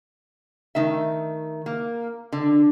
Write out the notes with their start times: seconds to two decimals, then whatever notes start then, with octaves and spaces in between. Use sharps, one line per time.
0.75 D#3 A3 E5
1.66 A#3
2.32 D3